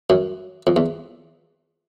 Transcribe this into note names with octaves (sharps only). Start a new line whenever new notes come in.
F#2
F2
E2